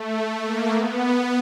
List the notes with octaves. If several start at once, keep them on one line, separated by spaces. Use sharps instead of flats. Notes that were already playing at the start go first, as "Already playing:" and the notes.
Already playing: A3
A#3
B3